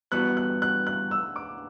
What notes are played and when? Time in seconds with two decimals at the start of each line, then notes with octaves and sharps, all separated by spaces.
0.12 G2 E3 B3 F#4 F#6
0.37 F#6
0.62 F#6
0.87 F#6
1.11 E6
1.36 D6